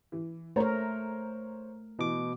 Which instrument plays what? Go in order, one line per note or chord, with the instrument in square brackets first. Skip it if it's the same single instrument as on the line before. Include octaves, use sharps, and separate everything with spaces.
[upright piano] E3
[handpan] A3 A#4 [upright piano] C5 C#5 A#5
[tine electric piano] B2 D6 [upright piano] E3